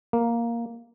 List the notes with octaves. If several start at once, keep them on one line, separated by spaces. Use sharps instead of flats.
A#3